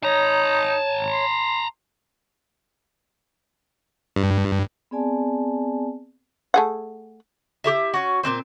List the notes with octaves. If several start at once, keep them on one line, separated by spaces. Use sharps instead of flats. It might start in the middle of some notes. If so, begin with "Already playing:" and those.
D#4 C#5 A5 A#5
C6
G2
B3 C4 G#4 D5 G#5 A5
A3 G#4 F#5
E4 G4 G#4 E5
C#4 F#4
A#2 E3 C4 C5